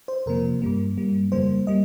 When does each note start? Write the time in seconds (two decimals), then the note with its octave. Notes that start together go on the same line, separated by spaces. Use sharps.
0.08 C5
0.26 F2 C3 F3 A#3 A#4
0.62 G2 G3 A#3
0.97 G2 G3 A#3
1.32 F2 C#3 G3 A#3 C5
1.67 G3 A#3 D#5